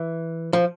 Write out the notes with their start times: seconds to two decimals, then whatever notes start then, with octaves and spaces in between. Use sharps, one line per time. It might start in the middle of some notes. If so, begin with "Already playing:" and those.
Already playing: E3
0.53 F3